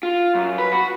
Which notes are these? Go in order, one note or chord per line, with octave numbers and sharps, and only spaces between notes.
F4
F#2
B4
F#4